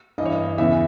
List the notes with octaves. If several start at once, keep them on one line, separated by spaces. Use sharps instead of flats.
G2 E3 D#5
C#5
D#5
E2 C#3 E3 E5